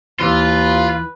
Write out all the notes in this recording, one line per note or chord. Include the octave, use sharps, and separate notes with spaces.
D#2 E3 F4 B4